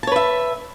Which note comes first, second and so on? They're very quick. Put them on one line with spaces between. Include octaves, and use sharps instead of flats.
A5 C#5 B4 E5